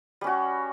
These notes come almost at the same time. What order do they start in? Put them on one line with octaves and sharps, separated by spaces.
G3 C#4 F#4